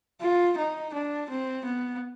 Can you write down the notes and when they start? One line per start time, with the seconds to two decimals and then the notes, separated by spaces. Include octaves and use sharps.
0.21 F4
0.57 D#4
0.93 D4
1.30 C4
1.65 B3